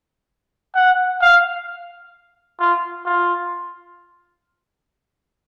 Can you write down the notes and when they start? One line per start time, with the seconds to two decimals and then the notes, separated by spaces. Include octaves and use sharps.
0.75 F#5
1.21 F5
2.60 F4
3.06 F4